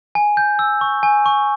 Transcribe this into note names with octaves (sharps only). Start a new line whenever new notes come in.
G#5
G6
E6
C#6
G#5
C#6